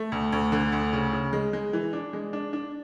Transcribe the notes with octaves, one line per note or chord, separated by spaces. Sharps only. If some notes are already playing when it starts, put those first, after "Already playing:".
Already playing: A3
D2
D2
D3
D2
C#3
C#3
G#3
G#3
E3
D4
G#3
D4
D4